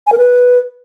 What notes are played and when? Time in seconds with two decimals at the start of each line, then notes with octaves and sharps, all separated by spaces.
0.07 G#5
0.12 A#4
0.18 B4